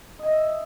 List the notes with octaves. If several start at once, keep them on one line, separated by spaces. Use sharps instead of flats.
D#5 E5 G#5